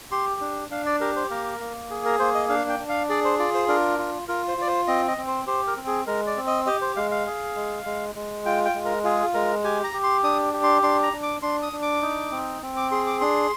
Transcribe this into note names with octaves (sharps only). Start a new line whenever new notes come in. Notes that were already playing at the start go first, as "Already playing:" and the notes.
G4 C6
D4
D4 F5
D5
G4 A#4
C5
A#3 A#4
A#3
G#4
A#4
A#3 C5
D#5
D4 F5
G5
D4
F5
G#4 D5
C5
F4 D5
C5
D4 A#4
F4
F4 A#4
C5
F4 D5
C5
C4 D#5
D#5
C4
C5
G4 C5
A#4
C4
G#4
G#3 A#4
D5
C4
D#5
G4 D#5
C5
G#3 F5
F5
G#4
G#3
G#3
G#3
F4 G5
G5
G#3
A#4
F4 G#4
G#3 A#4
G4 G#5
A#5
G4
C6
D4 D#6
G4
C6
D4 C6
A#5
D4
D6
D4 C6
D#6
D4
D6
D#4
C4
C4
D6
G#4 C6
D6
D4 C6